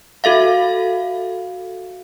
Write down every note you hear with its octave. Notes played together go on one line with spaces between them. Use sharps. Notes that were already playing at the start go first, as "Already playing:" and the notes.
F#4 A4 E5 F5